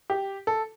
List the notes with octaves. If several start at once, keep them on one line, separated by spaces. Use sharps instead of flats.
G4
A4